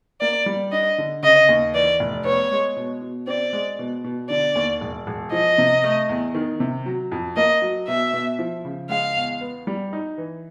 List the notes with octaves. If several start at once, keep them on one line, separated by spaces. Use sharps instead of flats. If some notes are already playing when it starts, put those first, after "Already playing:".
A#3 D5
G3
D4 D#5
D3
C#3 D#5
D#2
E3 D5
F1
B3 C#5
G#3
B2
B2
C4 D5
G#3
B2
B2
D3 D5
D#2
E1
E1
F3 D#5
C3
A3
E2
D#3
C3
F#3
F2
A#3 D#5
F#3
B2 E5
B2
F3
C#3
G#3 F5
E2
B3
G3
D#4
E3